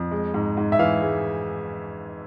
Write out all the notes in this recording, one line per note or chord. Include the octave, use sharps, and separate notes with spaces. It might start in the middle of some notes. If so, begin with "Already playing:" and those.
Already playing: F2
G#3
G#2
G#2
E5
E3 F5
G#3